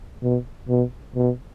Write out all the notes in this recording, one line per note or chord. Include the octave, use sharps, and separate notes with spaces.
B2
B2
B2